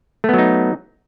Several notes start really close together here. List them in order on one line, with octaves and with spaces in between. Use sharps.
A3 B3 F#3 D#4